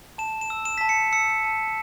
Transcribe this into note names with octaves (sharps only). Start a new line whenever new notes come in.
A5 E7
E7
E6
E7
A5 B6
C#7
E6 C#7
A5